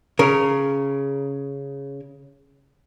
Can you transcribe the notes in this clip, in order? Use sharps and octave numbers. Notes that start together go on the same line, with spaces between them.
C#3 A#4